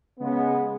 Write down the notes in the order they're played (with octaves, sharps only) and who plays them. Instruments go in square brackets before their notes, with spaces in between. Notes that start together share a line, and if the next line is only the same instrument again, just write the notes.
[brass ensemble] C#3 G#3 B3